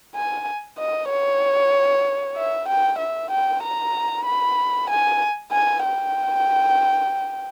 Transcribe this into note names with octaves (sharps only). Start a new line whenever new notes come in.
G#5
D#5
C#5
E5
G5
E5
G5
A#5
B5
G#5
G#5
G5